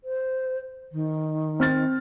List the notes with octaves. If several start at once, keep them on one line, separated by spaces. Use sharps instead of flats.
C5
D#3
C4 F6 A6